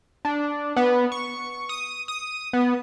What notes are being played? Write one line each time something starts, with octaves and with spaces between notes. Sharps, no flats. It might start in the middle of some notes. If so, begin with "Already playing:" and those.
D4
B3
C#6
D#6
D#6
B3